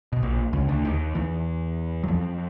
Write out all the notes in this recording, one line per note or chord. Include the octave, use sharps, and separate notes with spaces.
B2
A#1 A#2
C#2 C#3
D2 D3
D#2 D#3
E2 E3
F#3
F2 F3